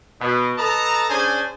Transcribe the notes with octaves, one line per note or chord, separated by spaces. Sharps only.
B2 B3
A4 B4 D#5 A5 A#5
C#4 D4 G#4 C5 D5 G#5